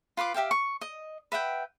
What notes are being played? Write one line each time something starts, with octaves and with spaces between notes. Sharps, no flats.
F4 B4 C6 D6
G4 E5 F5 G5
C#6
D#5
B4 E5 F#5 G5